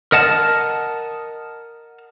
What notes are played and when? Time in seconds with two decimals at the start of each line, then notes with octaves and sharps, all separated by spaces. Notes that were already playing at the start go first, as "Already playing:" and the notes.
0.12 A#4 D#5 F#5 A5